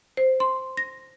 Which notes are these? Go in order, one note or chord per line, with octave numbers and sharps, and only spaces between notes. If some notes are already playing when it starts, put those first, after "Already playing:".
C5
C6
A#6